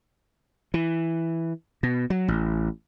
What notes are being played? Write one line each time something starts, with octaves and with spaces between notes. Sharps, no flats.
E3
B2
F#3
A1